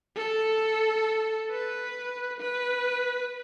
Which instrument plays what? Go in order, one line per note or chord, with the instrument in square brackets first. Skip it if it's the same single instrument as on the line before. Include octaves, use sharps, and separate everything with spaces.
[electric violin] A4
B4
B4